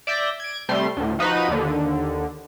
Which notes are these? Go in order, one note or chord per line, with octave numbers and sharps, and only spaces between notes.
D5 E5 G6 A#6
G#6 D7
C3 G3 A3 C6
D2 A2
F3 D#4 F#4 B4 D#7
D#2 D3